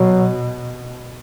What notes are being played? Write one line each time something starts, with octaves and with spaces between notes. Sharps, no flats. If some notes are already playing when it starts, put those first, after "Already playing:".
Already playing: B2 F#3